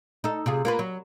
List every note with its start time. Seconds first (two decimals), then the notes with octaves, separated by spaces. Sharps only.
0.24 D#4 A4
0.46 C3 F4 G#4
0.65 A#3 F4 B4
0.79 F#3